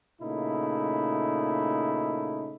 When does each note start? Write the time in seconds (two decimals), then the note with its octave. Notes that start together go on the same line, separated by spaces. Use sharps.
0.21 A#2 C#3 A3 D#4 E4